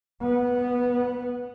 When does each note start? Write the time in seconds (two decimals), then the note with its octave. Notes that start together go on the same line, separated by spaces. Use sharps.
0.22 B3